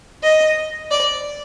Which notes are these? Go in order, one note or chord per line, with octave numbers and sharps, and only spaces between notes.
D#5
D5